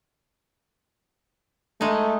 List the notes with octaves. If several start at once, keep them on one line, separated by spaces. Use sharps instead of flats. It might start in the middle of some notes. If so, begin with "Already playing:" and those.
G#3 A3 D#4